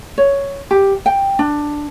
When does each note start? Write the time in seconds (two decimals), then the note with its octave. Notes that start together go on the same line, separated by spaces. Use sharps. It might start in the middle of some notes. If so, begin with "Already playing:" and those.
0.18 C#5
0.71 G4
1.06 G5
1.39 D4